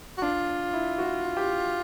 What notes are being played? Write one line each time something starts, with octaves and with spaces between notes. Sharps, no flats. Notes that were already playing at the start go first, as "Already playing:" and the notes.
F#4
D4 F4
E4
F#4
G4